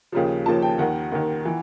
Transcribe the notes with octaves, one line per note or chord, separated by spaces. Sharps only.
D#2 C#3 F3
D#2 C#3 F3 A5
G5
D#2 D#3 F#5
D#2 D#3
E3